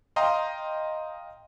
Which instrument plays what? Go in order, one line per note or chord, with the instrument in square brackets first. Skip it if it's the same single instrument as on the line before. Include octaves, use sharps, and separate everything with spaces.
[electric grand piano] D#5 F5 G5 A#5 C6 D#6